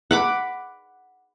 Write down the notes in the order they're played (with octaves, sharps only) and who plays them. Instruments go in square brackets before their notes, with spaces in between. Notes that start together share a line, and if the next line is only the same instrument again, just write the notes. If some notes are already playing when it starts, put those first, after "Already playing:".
[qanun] F#5 B5 D6